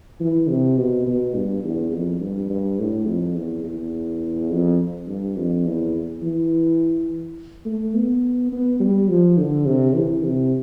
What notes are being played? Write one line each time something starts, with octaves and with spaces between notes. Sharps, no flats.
E3
C3
B2
B2
G2
E2
F2
G2
G2
A2
F2
E2
E2
F2
G2
F2
E2
E3
A3
B3
B3
G3
F3
D3
C3
E3
C3